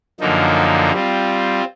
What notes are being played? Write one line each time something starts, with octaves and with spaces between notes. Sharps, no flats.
F#2 D3 F3 A#3 D#4
G3 C4 F4